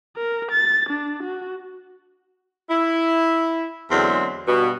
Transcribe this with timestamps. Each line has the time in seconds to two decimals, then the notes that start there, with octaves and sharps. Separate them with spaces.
0.16 A#4
0.51 A6
0.89 D4
1.23 F#4
2.70 E4
3.91 E2 D3 F#3 G#3 C4
4.47 G2 B2